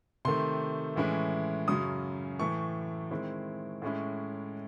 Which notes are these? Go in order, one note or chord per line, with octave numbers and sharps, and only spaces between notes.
C3 D#3 A3 C6
A2 E3 G#3 C#4 E4
F#2 C#3 F#3 C#4 D#6
A2 E3 A3 C#6
D#3 G#3 C4 E4
A2 G#3 C#4 E4